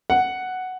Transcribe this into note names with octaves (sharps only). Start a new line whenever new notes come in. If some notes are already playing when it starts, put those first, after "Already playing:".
F#5